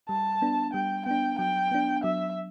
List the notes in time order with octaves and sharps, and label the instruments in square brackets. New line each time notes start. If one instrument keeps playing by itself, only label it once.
[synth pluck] G3 [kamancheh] A5
[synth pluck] B3 D4
[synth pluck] G3 [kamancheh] G5
[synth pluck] B3 D4 [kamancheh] G5
[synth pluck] F#3 [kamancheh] G5
[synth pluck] B3 D4
[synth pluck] F#3 [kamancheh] E5